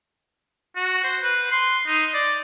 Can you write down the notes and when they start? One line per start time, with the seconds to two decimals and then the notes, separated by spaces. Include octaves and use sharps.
0.76 F#4
1.04 C5
1.23 B4
1.52 C6
1.87 D#4
2.14 D5